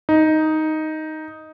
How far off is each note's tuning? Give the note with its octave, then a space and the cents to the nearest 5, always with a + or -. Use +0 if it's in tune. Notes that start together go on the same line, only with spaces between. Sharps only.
D#4 +5